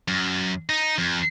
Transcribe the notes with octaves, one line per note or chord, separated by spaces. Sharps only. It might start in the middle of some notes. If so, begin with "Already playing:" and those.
F#2
D#4
F2